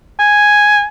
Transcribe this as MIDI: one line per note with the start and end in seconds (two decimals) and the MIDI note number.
0.19 0.86 80